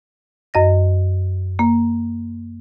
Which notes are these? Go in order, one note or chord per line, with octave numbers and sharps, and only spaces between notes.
F#2 D#5 A#6
A#3